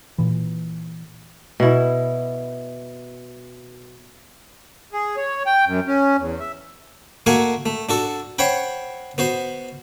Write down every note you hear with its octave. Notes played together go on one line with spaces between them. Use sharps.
A#2 E3
B2 E4
G#4
C#5
G5
F#2
C#4
E2
E5
A3 A#3 F#4 F#5 G#5
A3
D4 F#4 A4
C5 C#5 F#5 G5 B5
B3 F#4 C5